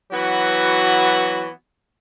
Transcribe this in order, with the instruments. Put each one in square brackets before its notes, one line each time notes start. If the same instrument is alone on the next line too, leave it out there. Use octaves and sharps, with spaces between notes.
[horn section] E3 F#3 B3 F#4